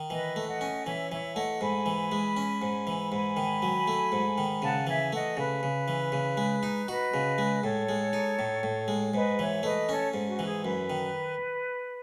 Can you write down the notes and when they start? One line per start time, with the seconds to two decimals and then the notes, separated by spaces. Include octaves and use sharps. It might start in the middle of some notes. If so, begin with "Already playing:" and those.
Already playing: D#3
0.10 E3 B4 D#5
0.36 A3
0.48 D#5 F#5
0.61 C#4
0.86 E3 C#5 E5
1.11 E3 C#5 E5
1.32 G#5
1.36 A3 D#5 F#5
1.61 G#2 G#5 B5
1.86 E3
2.12 G#3
2.37 C#4
2.62 G#2
2.87 E3
3.11 G#2 G#5 B5
3.37 D#3
3.62 F#3
3.88 A3
4.12 G#2
4.38 D#3
4.62 C#3 F#5 A5
4.87 E3 E5 G#5
5.12 A3 D#5 F#5
5.37 C#3 B4
5.63 C#3
5.88 E3
6.12 C#3
6.37 G#3
6.63 D#4
6.88 F#4 B4 D#5
7.14 C#3
7.38 G#3
7.63 A2 A4 C#5
7.89 G#3
8.13 D#4
8.39 A2
8.63 A2
8.88 G#3
9.14 G#2 B4 D#5
9.39 E3 C#5 E5
9.63 A3 B4 D#5
9.88 C#4 A4 C#5
10.14 G#2
10.27 F#4
10.39 E3
10.45 G#4
10.64 F#2 B4
10.90 D#3